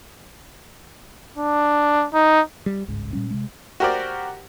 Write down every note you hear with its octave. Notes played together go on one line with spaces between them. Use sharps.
D4
D#4
G3
G1 C#2 G#2
A#2 G3 C#4
C3 G#3
F#4 G4 A#4 C5 D5